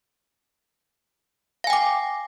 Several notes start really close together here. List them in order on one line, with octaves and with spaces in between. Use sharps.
F5 G#5 G5 D6